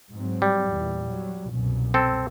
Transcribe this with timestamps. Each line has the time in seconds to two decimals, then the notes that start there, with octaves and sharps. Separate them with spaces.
0.12 G#2 F#3 C4
0.42 G3
0.73 E2 A#2 E3
1.08 F#3
1.49 C2 F#2 B2
1.94 C4 A4